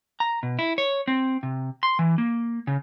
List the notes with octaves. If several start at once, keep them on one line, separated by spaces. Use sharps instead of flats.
A#5
B2
E4
C#5
C4
C3
C6
E3
A#3
C#3